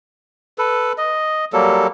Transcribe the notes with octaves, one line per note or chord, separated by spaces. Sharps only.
A4 B4
D#5
F#3 G3 A#3 A4